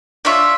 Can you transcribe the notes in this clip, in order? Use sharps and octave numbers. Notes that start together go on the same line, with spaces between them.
D4 F4 C#5 E5